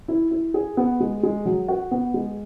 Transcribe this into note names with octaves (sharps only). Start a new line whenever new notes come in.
E4
E4
G#4
B3
G#3
G#3
F#3
F#4
B3
G#3